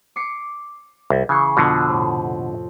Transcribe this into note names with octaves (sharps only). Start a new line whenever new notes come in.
D6 C7 C#7
C2
C#3 E3 G#5 C6 C#6
F2 B2 D3 C6 D#6
A2 C3